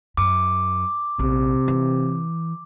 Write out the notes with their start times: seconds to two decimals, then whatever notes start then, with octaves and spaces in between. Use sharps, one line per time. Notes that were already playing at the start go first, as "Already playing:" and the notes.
0.17 F#2 D6
1.19 A#1 C3
1.68 E3